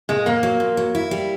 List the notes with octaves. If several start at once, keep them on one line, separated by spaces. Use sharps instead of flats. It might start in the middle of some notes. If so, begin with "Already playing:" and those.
A#2 G#3
A#2 A#3
F#3
A#2
F#3
E4
G3